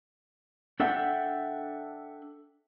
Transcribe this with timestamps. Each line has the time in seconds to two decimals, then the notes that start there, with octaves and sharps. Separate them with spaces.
0.80 D4 A4 E5 F#5 G5